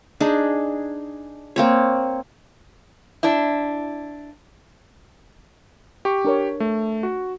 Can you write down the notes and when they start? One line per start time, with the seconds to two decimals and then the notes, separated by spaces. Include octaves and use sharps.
0.20 D4 D#4 G#4
1.56 A#3 C4 C#5
3.23 D4 E4
6.05 G4 C#6
6.25 D4 A#4 C#5
6.60 A3
7.03 F#4